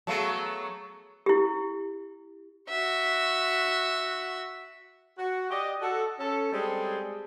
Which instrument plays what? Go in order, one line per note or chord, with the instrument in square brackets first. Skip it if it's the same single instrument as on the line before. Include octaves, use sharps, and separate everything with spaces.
[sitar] F#3 A3 B3 [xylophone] G#4 F5 A5
[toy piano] E4 G4
[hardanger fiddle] F#4 E5
[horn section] F#4
G4 D5 D#5
F#4 A4
C#4 A4
G3 G#3 C4 G#4 A4